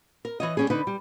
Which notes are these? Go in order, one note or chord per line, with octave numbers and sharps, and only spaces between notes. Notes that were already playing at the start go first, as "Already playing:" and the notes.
A#4
E3 C#5 D#5
G3 C#4 G#4
D3 D#4 B4
G3